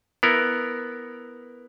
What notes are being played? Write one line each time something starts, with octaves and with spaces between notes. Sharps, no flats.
B3 E4 A#4